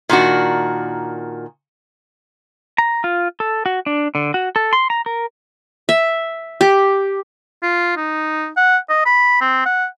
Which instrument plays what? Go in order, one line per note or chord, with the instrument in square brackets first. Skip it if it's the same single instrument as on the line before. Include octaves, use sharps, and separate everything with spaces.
[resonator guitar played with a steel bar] A#2 D#3 D4 F#4
[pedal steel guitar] A#5
F4
A4
F#4
D4
D3
F#4
A4
C6
A#5
A#4
[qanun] E5
G4
[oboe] F4
D#4
F#5
D#5
B5
C4
F#5